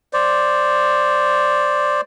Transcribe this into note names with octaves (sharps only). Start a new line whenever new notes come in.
C5 D5